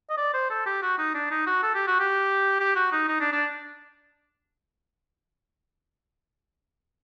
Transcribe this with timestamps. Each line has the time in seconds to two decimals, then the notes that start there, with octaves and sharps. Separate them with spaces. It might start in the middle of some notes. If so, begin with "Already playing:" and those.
0.10 D#5
0.17 D5
0.33 C5
0.50 A4
0.66 G4
0.82 F#4
0.98 D#4
1.14 D4
1.31 D#4
1.47 F#4
1.63 A4
1.75 G4
1.87 F#4
2.00 G4
2.60 G4
2.76 F#4
2.92 D#4
3.08 D#4
3.20 D4
3.32 D4